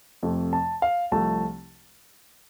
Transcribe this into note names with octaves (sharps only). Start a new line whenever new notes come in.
F2 C3 F3 A3
A5
F5
C2 C3 F3 A3 A5